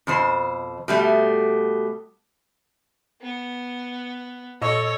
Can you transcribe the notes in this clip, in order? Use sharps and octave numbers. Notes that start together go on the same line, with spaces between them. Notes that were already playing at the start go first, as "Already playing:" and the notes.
F2 B2 C5
B2 G3 A3
B3
A#2 A4 C#5 D#5 C#6 E6